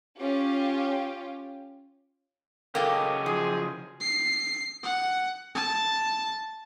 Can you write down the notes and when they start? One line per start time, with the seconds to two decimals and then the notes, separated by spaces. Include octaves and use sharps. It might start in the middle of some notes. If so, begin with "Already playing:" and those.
0.18 C#4 F4 G4
2.75 C#3 F#3 A#3 G4 A4 D#5
3.26 F3 G#4
4.01 C7
4.83 F#5
5.55 A5